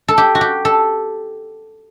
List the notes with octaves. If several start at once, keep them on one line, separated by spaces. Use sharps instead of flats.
A4
G4
F#4
G4
A4